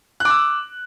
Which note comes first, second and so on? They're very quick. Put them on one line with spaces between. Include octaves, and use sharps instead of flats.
F#6 D6 E6